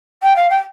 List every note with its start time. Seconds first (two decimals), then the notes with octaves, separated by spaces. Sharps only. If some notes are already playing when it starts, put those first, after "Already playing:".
0.22 G5
0.36 F5
0.50 G5